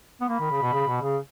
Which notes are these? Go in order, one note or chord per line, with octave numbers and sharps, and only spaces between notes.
B3
A#3 B5
D#3
C#3
B2
C#3
B2
C#3